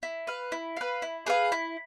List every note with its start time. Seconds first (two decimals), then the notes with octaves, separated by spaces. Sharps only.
0.03 E4
0.27 B4 F5
0.52 E4
0.77 B4 F5
1.02 E4
1.26 G#4 B4 F5
1.52 E4